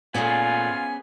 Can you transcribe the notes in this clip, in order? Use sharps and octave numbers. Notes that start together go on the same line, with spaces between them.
A#2 A3 B3 C#4 F4 G#4 G#5